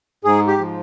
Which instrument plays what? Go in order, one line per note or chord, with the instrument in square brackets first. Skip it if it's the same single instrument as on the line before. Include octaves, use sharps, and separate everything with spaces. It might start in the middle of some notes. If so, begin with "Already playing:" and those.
[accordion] G#2 G#4
G4
F3